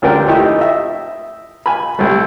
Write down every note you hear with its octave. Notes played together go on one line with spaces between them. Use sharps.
D2 D3 C#4 D4 A#4 G5
F3 A3 D#4 E4 G4
D#5 E5
G#5 B5
C2 A3